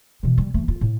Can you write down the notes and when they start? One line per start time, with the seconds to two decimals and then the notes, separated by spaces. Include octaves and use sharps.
0.23 B2 E3
0.38 G3
0.54 E3 A3
0.68 F4
0.81 A2